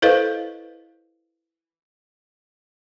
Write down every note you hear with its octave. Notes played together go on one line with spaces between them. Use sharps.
E4 A4 B4 C5 D#5 F5